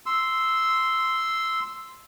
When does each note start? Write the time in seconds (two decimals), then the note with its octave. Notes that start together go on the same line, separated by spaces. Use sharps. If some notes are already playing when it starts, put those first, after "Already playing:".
0.06 C6 E6